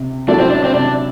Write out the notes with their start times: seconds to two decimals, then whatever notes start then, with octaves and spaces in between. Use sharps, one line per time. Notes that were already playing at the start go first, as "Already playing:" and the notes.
Already playing: C3
0.28 F#3 A3 D4 E4 A4
0.39 C4
0.50 D4
0.64 C4
0.74 C3 D4